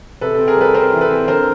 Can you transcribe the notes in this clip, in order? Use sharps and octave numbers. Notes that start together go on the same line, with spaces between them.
C3 A4 B4
C4 A4
G#4 A#4
G3 A4 B4
C4 A#4 C5
E3
A4 B4
C4
D3 A#4 C5